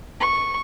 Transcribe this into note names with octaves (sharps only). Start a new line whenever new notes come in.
C#6